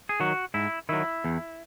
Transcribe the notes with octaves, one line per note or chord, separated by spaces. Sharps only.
G#4
D#3 F#3 F#4
G#2 E4
D#3 F#3 E4
E2